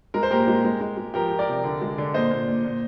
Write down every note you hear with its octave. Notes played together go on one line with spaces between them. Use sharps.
G#3 A#4
C5
A#2 G4 A#4
G#3
G#3
G#3
G#3
F3 G4 A#4
F3
A#4 D5
C3
D3
G#3
D3
A#2 C5 D#5
A#2
A#2
A#2